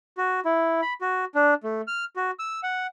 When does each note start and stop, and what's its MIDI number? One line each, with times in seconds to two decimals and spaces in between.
0.17 0.40 66
0.45 0.81 64
0.82 0.94 83
1.01 1.25 66
1.35 1.54 62
1.63 1.81 57
1.87 2.05 89
2.16 2.31 66
2.39 2.60 88
2.63 2.87 78